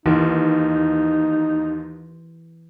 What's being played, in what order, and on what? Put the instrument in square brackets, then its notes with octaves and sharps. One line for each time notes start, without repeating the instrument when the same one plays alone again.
[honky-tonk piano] D#2 [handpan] E3 [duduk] D#4